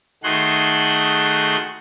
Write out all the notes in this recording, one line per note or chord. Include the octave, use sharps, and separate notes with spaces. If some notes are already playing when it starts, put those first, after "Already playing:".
D#3 A3 F#4 G#4 C6 F#6